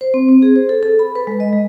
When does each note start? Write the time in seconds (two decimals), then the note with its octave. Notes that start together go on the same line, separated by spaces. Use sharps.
0.01 C5
0.14 C4
0.29 C4
0.42 G#4
0.56 C5
0.69 A4
0.83 A4
0.99 B5
1.15 B4
1.27 G#3
1.40 D#5
1.53 G#3